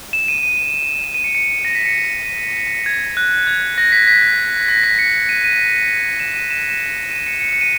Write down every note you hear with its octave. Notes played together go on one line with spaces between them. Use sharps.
E7
D#7
D#7
D#7
E7
D#7
C#7
C#7
A#6
B6
C#7
D#7
D#7
D#7
G#6
F#6
G#6
A#6
B6
B6
A#6
B6
C#7
D#7
D#7
E7
D#7
E7
E7
D#7
C#7
C#7
C#7
D#7